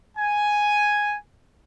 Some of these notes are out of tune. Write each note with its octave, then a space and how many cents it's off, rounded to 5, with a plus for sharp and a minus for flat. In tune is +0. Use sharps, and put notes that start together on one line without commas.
G#5 +0